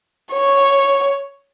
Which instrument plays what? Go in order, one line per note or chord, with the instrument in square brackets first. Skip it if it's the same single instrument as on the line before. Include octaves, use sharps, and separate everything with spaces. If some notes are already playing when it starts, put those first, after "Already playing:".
[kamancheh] C#5